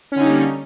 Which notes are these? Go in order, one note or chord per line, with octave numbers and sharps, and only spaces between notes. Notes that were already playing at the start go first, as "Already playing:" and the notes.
D3 G3 A#3 C#4 D#4